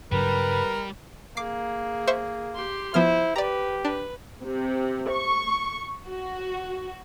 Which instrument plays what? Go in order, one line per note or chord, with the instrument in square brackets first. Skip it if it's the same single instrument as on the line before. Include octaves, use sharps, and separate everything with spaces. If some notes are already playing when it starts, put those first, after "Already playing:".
[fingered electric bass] G2 C#3 F#3 [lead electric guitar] G3 [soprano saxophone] A#4 [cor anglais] B4
[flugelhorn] A#3 [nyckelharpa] G#4 [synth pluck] D6 C7
[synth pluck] C5 E5 C#6
[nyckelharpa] G4 C6
[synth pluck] F3 B3 F6 [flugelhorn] E4 [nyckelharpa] C5
[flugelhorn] G4 [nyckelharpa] B4 [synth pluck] D5 A#5
[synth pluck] D4 [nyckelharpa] B4
[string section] C3
C#6
F#4